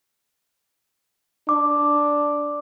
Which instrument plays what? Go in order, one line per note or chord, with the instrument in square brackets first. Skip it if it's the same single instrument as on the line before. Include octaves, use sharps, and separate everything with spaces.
[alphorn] D4 [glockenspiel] D6